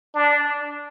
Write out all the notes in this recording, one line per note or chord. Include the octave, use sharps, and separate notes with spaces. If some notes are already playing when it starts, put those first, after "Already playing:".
D4